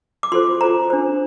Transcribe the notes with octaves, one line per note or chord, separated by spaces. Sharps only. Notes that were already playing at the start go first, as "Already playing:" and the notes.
D6
F4 A4 C5 C6
F4 A4 C5 A#5
D4 A4 C5